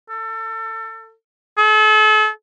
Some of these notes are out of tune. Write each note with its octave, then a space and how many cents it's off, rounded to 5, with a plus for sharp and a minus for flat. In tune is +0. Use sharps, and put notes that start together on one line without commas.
A4 +30
A4 -40